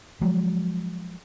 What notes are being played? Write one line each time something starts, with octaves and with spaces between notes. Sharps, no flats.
F3 F#3 G#3